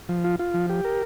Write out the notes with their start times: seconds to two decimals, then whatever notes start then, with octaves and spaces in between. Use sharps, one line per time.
0.09 F3
0.24 F4
0.39 F4
0.54 F3
0.69 G4
0.85 A#4